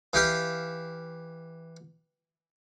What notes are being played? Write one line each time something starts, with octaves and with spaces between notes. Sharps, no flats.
E3 G4 F5